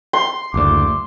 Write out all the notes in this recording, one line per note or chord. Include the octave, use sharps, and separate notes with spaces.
C6
F#1 D2 D6